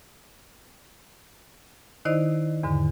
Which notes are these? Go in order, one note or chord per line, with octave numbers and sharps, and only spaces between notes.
D#3 D#4 E4 C5 D5 D#5
E2 G#2 D3